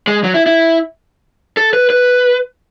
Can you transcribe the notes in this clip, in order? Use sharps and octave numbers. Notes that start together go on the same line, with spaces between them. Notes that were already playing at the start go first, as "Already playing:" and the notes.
G#3
F#3
E4
E4
A4
B4
B4